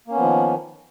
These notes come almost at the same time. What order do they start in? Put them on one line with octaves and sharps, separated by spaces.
A#3 C#4 B3 F3 D#3